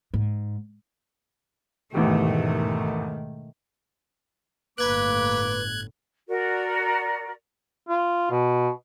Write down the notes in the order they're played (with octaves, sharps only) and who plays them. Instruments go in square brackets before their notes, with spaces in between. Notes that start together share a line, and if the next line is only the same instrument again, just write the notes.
[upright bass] G#2
[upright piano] A1 E2 G4 [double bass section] G#2 B2 D#3 [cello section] A3
[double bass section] G1 A2 [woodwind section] A#3 D6 [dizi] B4 [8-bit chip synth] F#6 G#6
[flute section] F#4 A#4 D5
[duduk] F4
B2